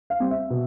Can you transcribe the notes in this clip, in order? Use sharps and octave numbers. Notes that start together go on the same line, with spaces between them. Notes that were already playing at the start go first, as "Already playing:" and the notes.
F5
G3 C4
E5
B2